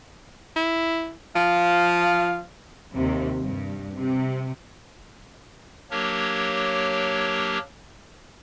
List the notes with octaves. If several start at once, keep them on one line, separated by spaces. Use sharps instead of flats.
E4
F3 F5
D#2 C3
G2
C3
F#3 A#3 D4 G4 A#4 C#5